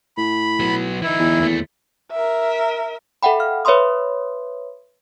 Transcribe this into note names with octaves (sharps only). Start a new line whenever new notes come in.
A2 B5
F#3 B3
E3 D#4 E4
E2
D#2 A3
A#4 E5
A4 E5 F#5 G5 B5
F5 F6
B4 C#5 E5 B5 C6 D#6